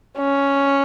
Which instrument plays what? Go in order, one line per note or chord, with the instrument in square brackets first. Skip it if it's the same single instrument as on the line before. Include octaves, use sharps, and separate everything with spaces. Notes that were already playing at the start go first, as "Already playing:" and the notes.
[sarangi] C#4